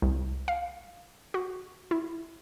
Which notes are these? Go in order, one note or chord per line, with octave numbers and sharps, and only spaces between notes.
C2
F5
F#4
E4